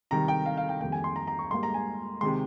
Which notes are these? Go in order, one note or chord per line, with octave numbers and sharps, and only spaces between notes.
C3 D#3 G3 A#5
G5
F5
F5
G5
F2 D#3 G3 A#3 G5
G#5
C6
A#5
A#5
C#6
G#2 G3 A#3 C6
A#5
G#5
C3 D#3 G#3 C6